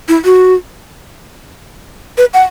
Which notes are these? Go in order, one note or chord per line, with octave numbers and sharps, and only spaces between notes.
E4
F#4
B4
F#5